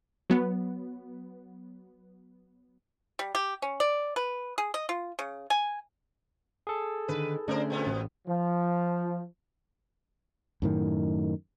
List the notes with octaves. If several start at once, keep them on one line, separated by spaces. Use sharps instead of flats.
F#3 B3
G3
G4
C#4
D5
B4
G#4
D#5
F4
C#3
G#5
G#4 A4
D3 D#3 B4
D3 A3 C#4 D4 A#4 C5
A#2 B3 C4
A1
F3
F#2 A2 D#3